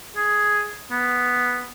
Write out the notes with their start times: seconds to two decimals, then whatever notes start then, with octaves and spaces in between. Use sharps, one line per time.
0.16 G#4
0.91 B3